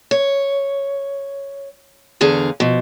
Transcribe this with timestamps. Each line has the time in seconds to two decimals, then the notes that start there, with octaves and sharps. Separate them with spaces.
0.11 C#5
2.21 E2 D3 G#4 F5
2.60 B2 F3